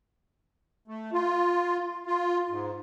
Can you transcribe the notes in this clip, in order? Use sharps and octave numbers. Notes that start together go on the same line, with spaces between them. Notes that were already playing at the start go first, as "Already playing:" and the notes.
A3
F4
F4
G#2